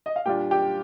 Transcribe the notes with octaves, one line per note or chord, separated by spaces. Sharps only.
D#5
F5
A#2 G3 D4 F4 G4 G5
G4 G5